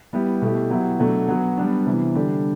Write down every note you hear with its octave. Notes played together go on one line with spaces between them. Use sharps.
G3 B3 E4 G4
B2 A3 E4 G4
F#3 B3 E4 G4
B2 F#3 A3 D4 F#4
F#3 B3 F#4
G3 B3 D4
C3 E3 B3
D3 G3 D4 G4